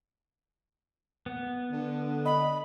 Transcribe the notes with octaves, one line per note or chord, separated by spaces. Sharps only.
B3
D3
D#5 B5